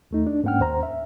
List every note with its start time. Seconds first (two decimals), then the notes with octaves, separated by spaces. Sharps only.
0.11 D#2 A3 D#4
0.27 D4
0.44 G#2 A#3 C#4 F#5 G5 F6
0.60 D#2 C5 A#5
0.83 E5